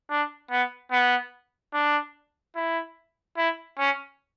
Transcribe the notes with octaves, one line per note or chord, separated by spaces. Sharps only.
D4
B3
B3
D4
E4
E4
C#4